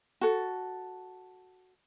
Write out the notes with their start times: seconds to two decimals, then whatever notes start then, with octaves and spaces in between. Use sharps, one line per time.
0.21 F#4 A4